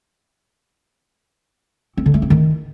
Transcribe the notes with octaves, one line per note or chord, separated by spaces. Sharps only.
C4
D3
A3
C4
D#3